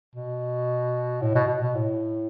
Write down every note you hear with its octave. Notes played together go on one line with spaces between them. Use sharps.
B2
A2
B2
B2
B2
A2